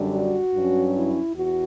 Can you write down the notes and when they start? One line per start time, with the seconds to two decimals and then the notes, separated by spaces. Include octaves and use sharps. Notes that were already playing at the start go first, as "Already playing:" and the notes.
Already playing: F#2 D3 G3 D4
0.14 F#4
0.55 G2 F#3 C#4
0.95 E4
1.35 E2 F#4